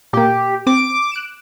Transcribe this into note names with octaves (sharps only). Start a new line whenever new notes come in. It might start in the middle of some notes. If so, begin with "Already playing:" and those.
A#2 A#3 G4
C4 D6
F#6 D7 E7